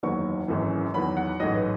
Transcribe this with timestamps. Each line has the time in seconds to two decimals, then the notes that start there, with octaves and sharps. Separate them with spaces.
0.03 F#1 E2 D#3 F#3 C#6
0.48 G#1 F#2 C#3 E3
0.94 E2 D#3 F#3 B5
1.17 F#5
1.40 A1 G#2 F#3 D#5
1.55 B4